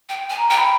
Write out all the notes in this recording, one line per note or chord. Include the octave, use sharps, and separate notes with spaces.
G5
G#5
A#5
G5
B5